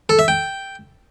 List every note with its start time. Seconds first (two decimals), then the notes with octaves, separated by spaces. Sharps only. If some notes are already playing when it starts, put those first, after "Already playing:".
0.09 A4
0.19 E5
0.28 G5